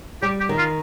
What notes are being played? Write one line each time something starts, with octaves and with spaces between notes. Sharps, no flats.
G3 G4
G4
D#3
F4